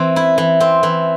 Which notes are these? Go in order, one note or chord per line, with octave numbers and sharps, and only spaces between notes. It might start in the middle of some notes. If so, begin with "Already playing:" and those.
Already playing: E3 C4
E4
E3
C4
E3